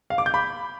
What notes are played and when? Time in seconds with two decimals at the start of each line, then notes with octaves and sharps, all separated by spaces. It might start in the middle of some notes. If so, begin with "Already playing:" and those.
0.10 F5
0.18 D6
0.26 G6
0.34 B5